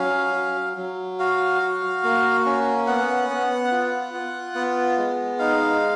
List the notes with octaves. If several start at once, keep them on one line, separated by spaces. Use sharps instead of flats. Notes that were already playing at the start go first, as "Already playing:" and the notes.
Already playing: F#3 C#4 F5
F#3
F#3
F#4 F5
F#4
A#3
C#4
B3 F#5
B3
F4
F4
B3
G#3
D#4 F5